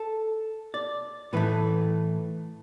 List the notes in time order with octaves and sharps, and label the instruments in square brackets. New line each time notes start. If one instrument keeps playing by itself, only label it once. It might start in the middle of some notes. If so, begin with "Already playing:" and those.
Already playing: [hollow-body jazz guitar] A4
D5
A2 E3 A3 B4